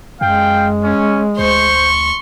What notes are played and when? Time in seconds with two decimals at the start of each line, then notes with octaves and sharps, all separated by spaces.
0.21 F#2 G#3 F5 G5
0.84 C#4
1.39 D2 C5 C6 C#6